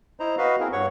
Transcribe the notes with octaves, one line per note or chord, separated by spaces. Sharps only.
E4 C5 D#5 A#5
F#4 B4 D#5 F5
C4 E4 G#4 A#4
G2 C#5 F#5 C#6